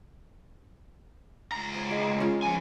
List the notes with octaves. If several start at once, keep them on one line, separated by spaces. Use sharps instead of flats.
C#2 A#5
C5 C#5
G#3
C#4 F4
F3 G#5